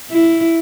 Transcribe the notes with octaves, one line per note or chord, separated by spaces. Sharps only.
E4